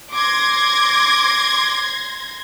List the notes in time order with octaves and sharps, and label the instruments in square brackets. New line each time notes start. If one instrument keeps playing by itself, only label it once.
[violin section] C6 G#6 A#6 [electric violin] D6